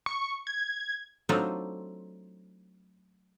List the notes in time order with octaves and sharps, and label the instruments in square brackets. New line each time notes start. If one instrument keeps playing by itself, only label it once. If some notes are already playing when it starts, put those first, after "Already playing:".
[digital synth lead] C#6
G#6
[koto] F#3 A3 C4 D4 D#4 F4